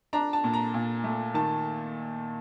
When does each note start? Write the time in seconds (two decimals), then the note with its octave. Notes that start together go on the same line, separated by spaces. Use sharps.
0.13 D4 A#5
0.33 A5
0.44 A#2
0.54 A#5
0.74 A#2
1.04 A3
1.34 D#3 A5